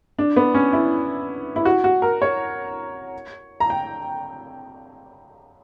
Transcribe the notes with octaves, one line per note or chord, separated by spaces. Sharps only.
D4
B3
C#4
E4
E4
F#4
F#4
A#4
C#5
A#5
G5